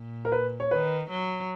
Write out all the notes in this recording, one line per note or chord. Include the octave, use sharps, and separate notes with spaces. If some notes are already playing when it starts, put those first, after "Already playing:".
Already playing: A#2
A#4
B4
C#5
D#3 B4
F#3